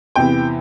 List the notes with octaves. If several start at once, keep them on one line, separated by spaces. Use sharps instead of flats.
E2 C3 E3 G5